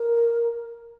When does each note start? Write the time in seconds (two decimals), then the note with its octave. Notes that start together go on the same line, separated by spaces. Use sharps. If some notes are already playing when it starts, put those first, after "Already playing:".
Already playing: A#4